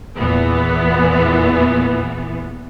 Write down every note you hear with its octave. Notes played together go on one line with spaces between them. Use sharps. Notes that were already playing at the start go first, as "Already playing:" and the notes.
E2 A#2 E3 B3